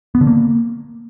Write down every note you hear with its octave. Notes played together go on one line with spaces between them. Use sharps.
B3
D3
A#3